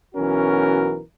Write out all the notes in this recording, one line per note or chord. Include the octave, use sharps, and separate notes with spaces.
B1 E3 C#4 F#4 A#4